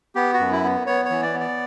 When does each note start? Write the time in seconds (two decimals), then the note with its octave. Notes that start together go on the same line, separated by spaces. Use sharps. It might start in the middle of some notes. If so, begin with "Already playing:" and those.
0.15 B3 G4
0.34 F#4
0.40 F#2
0.51 E4
0.64 B3
0.86 B3 C#5
1.05 E3 C#5
1.23 D5
1.34 B3
1.40 D5